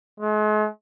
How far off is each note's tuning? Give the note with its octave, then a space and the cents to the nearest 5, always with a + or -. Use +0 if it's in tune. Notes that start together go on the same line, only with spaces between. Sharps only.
G#3 +40